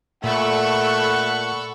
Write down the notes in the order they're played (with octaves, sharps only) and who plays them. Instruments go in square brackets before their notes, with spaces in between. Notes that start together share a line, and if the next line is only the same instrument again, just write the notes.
[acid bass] A#2 [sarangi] A3 [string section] A4 B5 C#6 [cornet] F#5